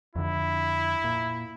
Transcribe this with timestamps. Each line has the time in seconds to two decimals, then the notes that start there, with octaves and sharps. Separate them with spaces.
0.16 F2 D3 E4
1.04 A#2